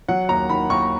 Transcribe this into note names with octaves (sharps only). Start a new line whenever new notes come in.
F#3 F#5
D#2 A#5
D#3 B5
D#2 C#6